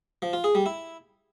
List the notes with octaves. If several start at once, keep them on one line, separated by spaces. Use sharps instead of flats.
F3
F4
G#4
G3
E4